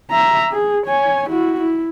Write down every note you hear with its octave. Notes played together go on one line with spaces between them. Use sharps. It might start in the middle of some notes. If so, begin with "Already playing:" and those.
E5 A#5
G#4
C#5 G#5
E4 F#4
E4